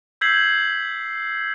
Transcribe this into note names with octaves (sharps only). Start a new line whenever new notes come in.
E6 G6 G#6 B6 C7 F#7